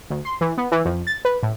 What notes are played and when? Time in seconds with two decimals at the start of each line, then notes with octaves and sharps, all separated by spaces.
0.10 D2
0.25 C6
0.41 E3
0.58 B3
0.72 E3
0.85 F2
1.07 A6
1.25 B4
1.43 A2